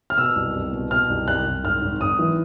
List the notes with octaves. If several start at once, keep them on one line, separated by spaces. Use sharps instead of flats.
F6
B2 E6
C2
C2
B2
B2 F6
C2
C2 F#6
C2
G#1 F6
G#1
G#1 D#6
E3